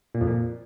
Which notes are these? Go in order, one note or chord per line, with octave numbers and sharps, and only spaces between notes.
A#2
F2
A#2